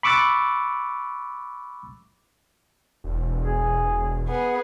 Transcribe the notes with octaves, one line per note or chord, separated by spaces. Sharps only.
B5 C#6 D6 E6 F#6 A6
E1
G#4
B3 G#4